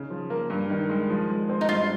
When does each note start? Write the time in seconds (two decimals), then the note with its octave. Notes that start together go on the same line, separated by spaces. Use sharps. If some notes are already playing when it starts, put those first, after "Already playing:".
Already playing: C#3 D#4
0.10 F3
0.30 A#3
0.50 G2
0.70 D#3
0.89 G#3
1.10 F3
1.30 G#3
1.49 C4
1.61 D#4
1.69 G2 F4